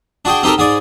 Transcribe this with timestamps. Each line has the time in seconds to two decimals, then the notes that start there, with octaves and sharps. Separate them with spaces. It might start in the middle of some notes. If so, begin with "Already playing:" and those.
0.25 D4 F#4 G#4 G5
0.43 C4 D#4 G4 A4 A#4
0.58 G#2 G#4 D5